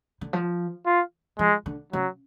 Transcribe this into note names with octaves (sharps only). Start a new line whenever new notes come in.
D3
F3
F4
F3 G#3
D3
C#3 F#3